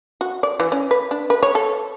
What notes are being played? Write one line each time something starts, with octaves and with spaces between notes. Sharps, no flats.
F#4
D5
E3
C#4
B4
D4
B4
C#5
A4